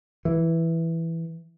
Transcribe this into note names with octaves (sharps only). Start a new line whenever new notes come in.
E3